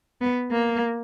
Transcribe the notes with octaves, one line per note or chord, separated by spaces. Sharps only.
B3
A#3